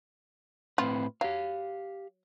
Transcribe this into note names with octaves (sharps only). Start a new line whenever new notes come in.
A2 C4 F4 B4
F#3 G4 F5